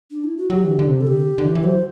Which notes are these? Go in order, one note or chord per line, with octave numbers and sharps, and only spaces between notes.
D4
E4
F#4
F#3 G4
E3
D3
D3
C3
A4
D3 G4
D3
E3
E3
F#3 C5